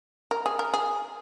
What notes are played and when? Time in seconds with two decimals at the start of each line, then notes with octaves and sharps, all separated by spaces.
0.31 A#4
0.46 G#4
0.59 A#4
0.73 G#4